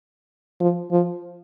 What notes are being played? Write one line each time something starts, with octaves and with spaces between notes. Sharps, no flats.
F3
F3